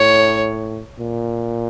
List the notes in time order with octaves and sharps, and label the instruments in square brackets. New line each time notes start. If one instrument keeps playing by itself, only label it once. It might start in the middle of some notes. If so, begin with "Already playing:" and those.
Already playing: [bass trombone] A2 [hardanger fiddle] C#5
[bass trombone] A#2